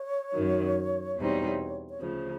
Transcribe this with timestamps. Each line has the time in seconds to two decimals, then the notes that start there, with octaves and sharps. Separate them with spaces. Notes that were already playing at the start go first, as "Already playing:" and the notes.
Already playing: C#5
0.34 F#2 D#3 F#3
1.17 E2 B2 G3 C4 D#4
1.90 C#5
2.01 D2 C#3 F3 C5